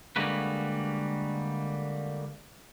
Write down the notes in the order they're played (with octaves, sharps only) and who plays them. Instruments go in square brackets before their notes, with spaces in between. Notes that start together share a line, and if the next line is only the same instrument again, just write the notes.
[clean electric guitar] D3 G3 G#3 A#3 F#4 B4